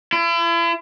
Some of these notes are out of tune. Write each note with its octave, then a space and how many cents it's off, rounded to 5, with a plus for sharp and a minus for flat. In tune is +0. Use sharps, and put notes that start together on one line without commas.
E4 +40